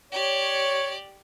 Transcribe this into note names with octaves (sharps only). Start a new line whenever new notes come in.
G4 C#5 D5